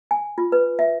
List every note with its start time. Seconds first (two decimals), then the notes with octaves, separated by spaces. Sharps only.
0.11 G#5
0.38 F4
0.52 B4
0.79 E5